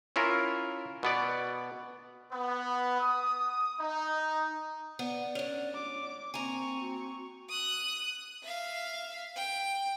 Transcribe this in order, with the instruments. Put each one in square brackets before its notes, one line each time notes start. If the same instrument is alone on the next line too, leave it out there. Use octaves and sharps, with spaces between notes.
[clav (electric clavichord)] C#4 E4 F4 A#4
B2 B3 D5
[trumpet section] B3
D#6
D#4
[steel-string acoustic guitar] B3 [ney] D5
[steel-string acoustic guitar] C#4 D4
[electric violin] D6
[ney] A#3 [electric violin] C4 C#6 [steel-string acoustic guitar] G#5 A#5
[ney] F#4
[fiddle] D#6 F#6
E5 F5
G5